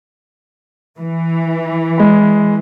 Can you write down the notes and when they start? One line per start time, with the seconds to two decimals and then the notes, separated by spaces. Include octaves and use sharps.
0.97 E3
1.98 G#3 B5